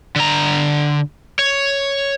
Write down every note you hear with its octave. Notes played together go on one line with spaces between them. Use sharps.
D3 A#5
C#5